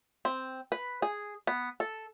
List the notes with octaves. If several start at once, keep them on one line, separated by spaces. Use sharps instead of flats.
C4
B4
G#4
B3
A4